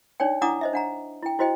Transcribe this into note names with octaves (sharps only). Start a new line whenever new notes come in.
D4 D#4 C#5 D5 G5
D4 E4 F#5 A#5 D6 D#6
C5 D#5 E5
D4 F#5 A#5
E4 G5
E4 F#4 C5 D#5 G5